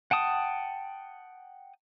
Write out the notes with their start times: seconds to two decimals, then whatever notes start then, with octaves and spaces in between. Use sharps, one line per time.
0.11 F#5 G5 A5 D#6